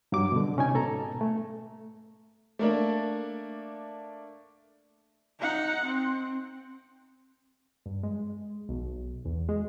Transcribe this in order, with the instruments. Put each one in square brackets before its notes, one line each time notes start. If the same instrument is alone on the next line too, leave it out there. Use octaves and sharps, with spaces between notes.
[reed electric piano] G2 F#3 D6
B2 D3
C3 C#4 D#4 G#5
G#2 B2 A4 A#5
A3
[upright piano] A3 A#3 D4
[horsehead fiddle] D#4 F#5
C4
[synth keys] G2
G#3
B1
E2
G#3